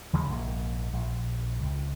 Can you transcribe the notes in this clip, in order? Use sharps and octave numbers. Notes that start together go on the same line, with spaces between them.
D#2 C#3 F3 G#3
A#1 G#2 E3 A#3
A#1
C#2